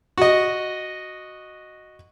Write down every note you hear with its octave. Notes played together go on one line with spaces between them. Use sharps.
F#4 D#5